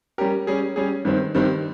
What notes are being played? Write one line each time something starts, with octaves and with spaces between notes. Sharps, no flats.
G3 C#4 G4 A#4
G3 C#4 G#4
G3 C#4 G#4
G2 D#3 G3 C4
G2 D#3 G3 C4